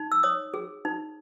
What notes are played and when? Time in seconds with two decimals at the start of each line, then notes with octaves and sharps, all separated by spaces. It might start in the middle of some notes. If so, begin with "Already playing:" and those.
Already playing: D#4
0.12 E6
0.23 C#5 D#6
0.54 G#4
0.85 D#4